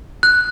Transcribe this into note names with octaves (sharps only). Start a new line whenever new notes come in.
F#6